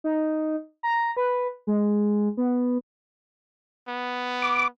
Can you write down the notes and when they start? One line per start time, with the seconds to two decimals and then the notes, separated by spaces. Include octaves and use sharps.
0.04 D#4
0.83 A#5
1.17 B4
1.67 G#3
2.37 B3
3.88 B3
4.42 D6